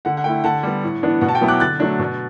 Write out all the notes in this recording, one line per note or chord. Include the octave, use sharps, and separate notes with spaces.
D3 F#5
F#5
A3 E4 G5
D3 F#5 A5
G3 B3
A2
E3 B3 D4
B2 F#5
A5
G5
F#3 B3 E4
D6 F#6
D3 F#6 A6
F#3 A3 D4
B2